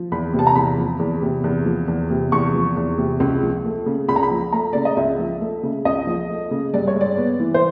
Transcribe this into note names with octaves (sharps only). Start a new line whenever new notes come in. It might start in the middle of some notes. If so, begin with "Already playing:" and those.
Already playing: F3
E2 B5
C3
A5
A#5
E2 B5
F3
E2
C3
E2
F3
E2
C3
E2 C#6
F3
E2
C3
C#2
F3
A3
C#3
C#2 B5
A#5
B5
F3
A3 A#5
C#3 D5
D#5
C#2 E5
F3
A3
C#3
C#2 D#5
F3
A3
C#3
G2 D5
C#5
G#3
D5
B3
E3
C5